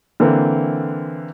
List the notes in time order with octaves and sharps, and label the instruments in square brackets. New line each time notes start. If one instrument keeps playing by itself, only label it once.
[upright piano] D3 E3 A#3 C4